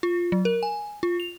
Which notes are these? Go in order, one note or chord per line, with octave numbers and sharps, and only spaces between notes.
F4
F#3
A#4
G#5
F4
F7